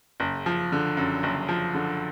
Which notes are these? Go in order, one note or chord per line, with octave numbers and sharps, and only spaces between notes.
F#1
F3
D3
F#2
F#1
F3
D3